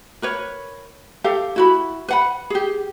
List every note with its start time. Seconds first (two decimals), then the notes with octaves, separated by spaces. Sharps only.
0.22 A#4 B4 C#5
1.24 G4 A4 F5
1.56 E4 F#4 B5
2.08 B4 F#5 B5
2.50 G4 G#4